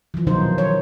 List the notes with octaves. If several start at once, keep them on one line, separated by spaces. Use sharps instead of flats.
E3 F3
B2 D#3 F#3 D#4 F4 C5
C#5